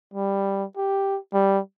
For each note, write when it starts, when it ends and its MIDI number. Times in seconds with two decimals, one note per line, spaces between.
0.14 0.65 55
0.77 1.18 67
1.34 1.60 55